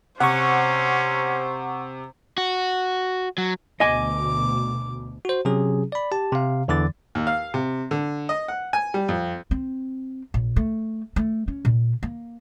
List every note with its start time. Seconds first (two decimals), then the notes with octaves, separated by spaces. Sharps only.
0.20 C3 C#4 C5 F#5 C#6
2.38 F#4
3.38 F#3
3.80 D2 B2 D#5 G#5 D6
5.25 F#4 C5
5.45 C3 F#3 C#4 G#4
5.92 D5 B5
6.12 G4 A5
6.32 C3 F5
6.68 E2 D3 E3 D6 A6
7.15 D#2
7.27 F5
7.54 C3
7.91 D3
8.29 D#5
8.48 F#5
8.73 G#5
8.94 G3
9.09 F2
9.51 C4
10.34 A#1
10.56 A3
11.16 A3
11.48 C#4
11.65 A#2
12.03 A#3